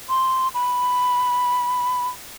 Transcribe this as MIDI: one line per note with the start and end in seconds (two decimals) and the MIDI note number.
0.09 0.48 84
0.54 2.09 83